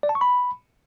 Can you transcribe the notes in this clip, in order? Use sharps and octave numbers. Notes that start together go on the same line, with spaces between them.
D5
A5
C#6
B5